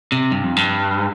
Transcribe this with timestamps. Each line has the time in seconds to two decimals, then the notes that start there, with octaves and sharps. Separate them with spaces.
0.12 C3
0.31 G2
0.43 F2
0.56 G2